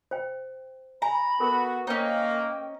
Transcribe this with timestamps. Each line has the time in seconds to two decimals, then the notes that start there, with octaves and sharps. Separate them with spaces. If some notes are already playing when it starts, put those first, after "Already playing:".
0.11 C5 G5
1.02 G#5 A#5 B5
1.40 B3 F#4 A4 A#4
1.87 A#3 C#4 D#4 C5 G5